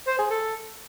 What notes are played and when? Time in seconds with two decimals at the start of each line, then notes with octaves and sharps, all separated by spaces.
0.07 C5
0.19 G#4
0.30 A4